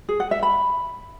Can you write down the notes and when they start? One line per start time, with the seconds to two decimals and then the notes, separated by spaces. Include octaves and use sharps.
0.09 G#4
0.20 F#5
0.31 E5
0.43 B5